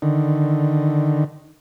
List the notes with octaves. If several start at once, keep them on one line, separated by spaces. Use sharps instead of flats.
D3 D#3